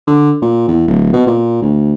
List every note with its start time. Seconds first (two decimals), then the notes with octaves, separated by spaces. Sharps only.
0.07 D3
0.42 A#2
0.68 E2
0.87 D1
1.13 B2
1.27 A#2
1.62 D2